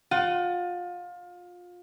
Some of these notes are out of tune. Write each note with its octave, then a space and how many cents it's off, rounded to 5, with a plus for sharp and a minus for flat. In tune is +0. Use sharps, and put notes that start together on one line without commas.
F4 +25 F#5 +40